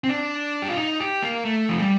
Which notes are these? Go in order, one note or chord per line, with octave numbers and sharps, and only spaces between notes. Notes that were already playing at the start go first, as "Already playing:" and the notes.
C4
D4
G4
F4
D#4
G4
A#3
A3
F3
G3